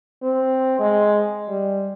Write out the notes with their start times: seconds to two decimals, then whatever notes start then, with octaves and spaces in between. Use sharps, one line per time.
0.23 C4
0.79 G#3
1.49 G3